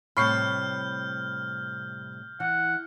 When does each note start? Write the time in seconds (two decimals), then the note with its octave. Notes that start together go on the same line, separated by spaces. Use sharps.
0.17 A2 C3 G3 B5 C#6 F6 G6 C7
2.40 E3 F#5